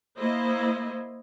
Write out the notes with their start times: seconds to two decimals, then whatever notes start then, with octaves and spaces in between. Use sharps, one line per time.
0.18 A#3 E4 C5 D#5